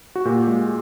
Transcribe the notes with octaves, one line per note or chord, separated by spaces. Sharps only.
F#4
A#2 G4
G#3